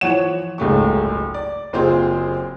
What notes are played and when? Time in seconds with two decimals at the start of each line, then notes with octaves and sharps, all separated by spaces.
0.01 E3 F3 C#5 F#5 E7
0.58 F#1 C#2 G#2 A3 G4 C#6
1.34 D5
1.73 F#1 C4 F4 G4 G#4 C5